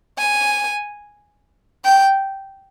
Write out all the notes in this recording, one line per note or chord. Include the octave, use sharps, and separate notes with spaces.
G#5
G5